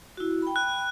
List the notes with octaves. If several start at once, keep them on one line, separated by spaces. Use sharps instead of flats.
E4 F#4
G5 B5
F#6